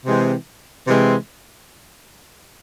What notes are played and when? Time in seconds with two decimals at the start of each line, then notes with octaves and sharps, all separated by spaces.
0.05 C3 E3 G#3 C4
0.87 C3 E3 G#3 C4